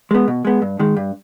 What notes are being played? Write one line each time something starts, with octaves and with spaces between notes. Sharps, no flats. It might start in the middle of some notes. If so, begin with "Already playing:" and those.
G#3 B3
B2
G#3 B3
G2
D#3 G#3
G2